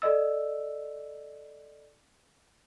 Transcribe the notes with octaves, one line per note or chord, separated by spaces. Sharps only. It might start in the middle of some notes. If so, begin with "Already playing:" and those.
A4 D5 D#5 E6